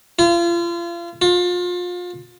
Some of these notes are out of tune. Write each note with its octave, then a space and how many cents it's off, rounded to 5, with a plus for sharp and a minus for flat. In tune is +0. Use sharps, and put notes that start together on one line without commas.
F4 -35
F4 +30